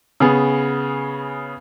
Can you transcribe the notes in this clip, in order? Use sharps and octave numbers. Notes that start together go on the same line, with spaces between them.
C#3 B3 G#4